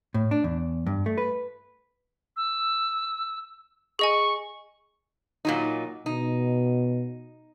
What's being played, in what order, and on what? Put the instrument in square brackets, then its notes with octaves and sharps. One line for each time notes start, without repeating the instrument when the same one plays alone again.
[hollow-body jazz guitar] A2
D4
E2
G2
A3
B4
[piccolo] E6
[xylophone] G#4 D#5 G#5 [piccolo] C#6
[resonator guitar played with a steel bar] A#2 F#3 D#4
[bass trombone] B2 [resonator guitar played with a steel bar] D#4